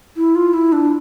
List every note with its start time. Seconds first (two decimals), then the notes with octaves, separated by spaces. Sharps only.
0.17 E4
0.35 F4
0.54 E4
0.72 D4